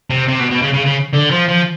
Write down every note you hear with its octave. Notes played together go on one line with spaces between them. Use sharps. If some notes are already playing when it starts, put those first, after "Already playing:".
C3
C3
B2
B2
C#3
C#3
C#3
D3
F3
F3